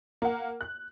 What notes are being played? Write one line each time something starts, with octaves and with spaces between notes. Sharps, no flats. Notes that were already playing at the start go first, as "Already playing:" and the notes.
A#3 F#5
F#6